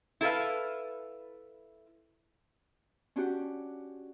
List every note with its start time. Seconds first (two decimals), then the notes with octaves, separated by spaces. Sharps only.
0.21 E4 A4 B4 F5
3.16 C#4 D4 F#4 G4 F#5